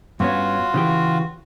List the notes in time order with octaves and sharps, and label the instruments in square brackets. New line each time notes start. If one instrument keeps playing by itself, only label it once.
[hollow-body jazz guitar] G2 B3 C#4 [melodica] F4 F#4
[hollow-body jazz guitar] C#3 E3 G4